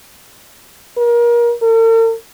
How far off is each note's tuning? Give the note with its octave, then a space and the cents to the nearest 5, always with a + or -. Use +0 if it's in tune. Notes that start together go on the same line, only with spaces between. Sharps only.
A#4 +30
A#4 -45